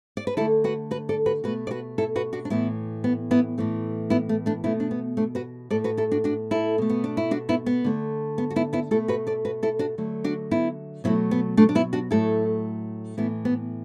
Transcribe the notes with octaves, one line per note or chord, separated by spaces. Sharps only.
D5
B4
D3 A3 E4 A4
F#4 B4
F#4 B4
A4 D5
F#4 B4
B2 A3 F#4 B4
D5
F#4 B4
E4 A4
F#4 B4
D4 F#4
D4
A2 E3 A3 B3 E4
B3
B3 E4
A2 E3 A3
B3 E4
A3
A3 D4
B2 A3 B3 E4
D4
B3
A3 D4
F#4 B4
A2 A3 A4 D5
F#4 B4
E4 A4
D4 F#4
D4 F#4
E4 A4
B2 A3
B3
D4
E4
D4 F#4
B3 E4
B3
D3 A3
B3
F#4
B3 E4
B3 E4
B2 A3 E4 A4
F#4 B4
A4 D5
F#4 B4
E4 A4
D4 F#4
D3 F#3 A3
D4 F#4
B3 E4
B2 F#3 A3 B3 E4
B3
A3 D4
D4
B3 E4
D4 F#4
A2 F#3 A3 E4 A4
A2 E3 A3 B3 E4
B3